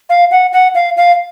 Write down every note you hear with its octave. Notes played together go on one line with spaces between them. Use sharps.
F5
F#5
F#5
F5
F5